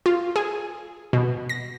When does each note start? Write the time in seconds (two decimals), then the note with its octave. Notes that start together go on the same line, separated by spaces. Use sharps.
0.06 F4
0.36 G#4
1.13 B2
1.49 A#6